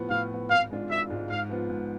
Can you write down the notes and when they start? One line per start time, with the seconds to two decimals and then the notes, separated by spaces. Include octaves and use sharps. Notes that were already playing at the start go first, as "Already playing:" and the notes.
Already playing: A2 F3 B3
0.11 A2 F5
0.31 F3 B3
0.50 G#1 F5
0.70 G#2 G#3 D4 F4
0.90 G#1 E5
1.10 G#2 G#3 D4 F4
1.29 G#2 F5
1.49 F3 B3 F4
1.70 G#2